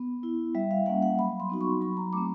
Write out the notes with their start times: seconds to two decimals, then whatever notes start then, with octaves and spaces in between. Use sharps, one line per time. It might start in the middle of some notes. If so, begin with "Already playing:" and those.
Already playing: B3
0.23 E4
0.55 G3 E5
0.71 F5
0.86 A#3 C#4 F#5
1.02 F#5
1.19 F#3 B5
1.40 C6
1.50 B3 D#4 F#4
1.61 C#6
1.81 F#3 B5
1.97 A#5
2.13 A3 C4 D6